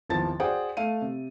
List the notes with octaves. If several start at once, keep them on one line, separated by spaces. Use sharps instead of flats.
G#1 E2 F3 B3 A5 A6
F#4 G#4 C5 D5 F#5 G5
A3 F5 D#7
C3